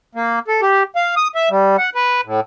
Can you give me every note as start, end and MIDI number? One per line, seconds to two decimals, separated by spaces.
0.15 0.39 58
0.48 0.61 69
0.62 0.83 67
0.96 1.15 77
1.17 1.28 87
1.35 1.49 76
1.50 1.77 55
1.78 1.90 78
1.95 2.21 71
2.25 2.40 45